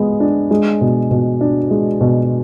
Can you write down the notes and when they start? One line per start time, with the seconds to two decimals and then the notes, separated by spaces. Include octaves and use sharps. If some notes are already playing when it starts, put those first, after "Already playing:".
Already playing: G#3 B3
0.20 D4
0.51 G#3
0.81 B2
1.11 B2
1.41 D4
1.71 G#3
2.01 B2